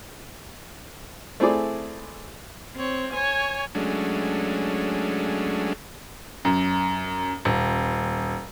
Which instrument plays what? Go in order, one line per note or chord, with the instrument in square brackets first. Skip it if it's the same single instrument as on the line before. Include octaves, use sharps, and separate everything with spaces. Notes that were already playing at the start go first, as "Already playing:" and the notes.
[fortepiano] A3 C4 E4 G#4 D5
[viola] C4 C#5
C#5 G#5
[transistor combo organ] F#3 G#3 A3 C#4 D4
[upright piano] F#2
D#1